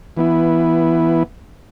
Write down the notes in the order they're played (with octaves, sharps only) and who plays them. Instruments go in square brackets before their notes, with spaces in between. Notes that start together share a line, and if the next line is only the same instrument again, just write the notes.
[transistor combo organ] E3 B3 E4